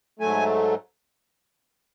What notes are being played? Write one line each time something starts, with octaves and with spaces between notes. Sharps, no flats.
G#2 F#3 A3 G#5